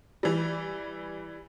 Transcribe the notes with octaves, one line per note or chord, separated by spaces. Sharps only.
E3 G3